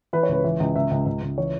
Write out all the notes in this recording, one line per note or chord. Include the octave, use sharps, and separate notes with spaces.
E3 B4
C#5
C#2 B4
E3
C#2
C#2 E5
C#2
C#2
C#2
E3 C#5